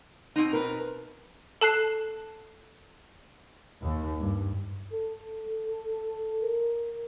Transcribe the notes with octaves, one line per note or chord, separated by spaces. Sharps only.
B2 C4 D#4
A#4 B4
A4 A5 F#6 C7
D#2
G2
A4
A#4